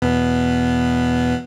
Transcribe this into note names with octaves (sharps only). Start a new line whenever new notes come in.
E2 B2 B3